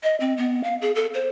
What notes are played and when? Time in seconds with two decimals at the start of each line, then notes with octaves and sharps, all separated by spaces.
0.03 D#5
0.20 C4
0.37 B3
0.64 F5
0.82 G#4
0.95 A4
1.14 C5